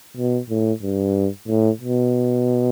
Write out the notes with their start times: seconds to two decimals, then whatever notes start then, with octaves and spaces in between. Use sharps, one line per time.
0.17 B2
0.50 A2
0.82 G2
1.48 A2
1.81 B2